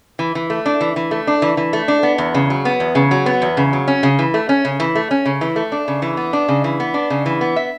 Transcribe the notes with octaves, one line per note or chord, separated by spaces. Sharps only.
E3
E3
A3
D4
E3
E3
A3
D4
E3
E3
A3
D4
B3
E2
C#3
F#3
B3
E2
C#3
F#3
B3
E2
C#3
F#3
C#4
C#3
E3
A3
C#4
C#3
E3
A3
C#4
C#3
E3
A3
D4
C#3
E3
B3
D4
C#3
E3
B3
D4
C#3
E3
B3
E5